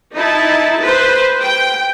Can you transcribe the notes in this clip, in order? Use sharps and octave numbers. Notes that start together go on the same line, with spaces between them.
D#4 E4 A5
B4 C5
G5